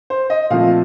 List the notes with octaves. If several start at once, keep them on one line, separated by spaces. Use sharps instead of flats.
C5
D#5
A#2 F3 A3 C4 F5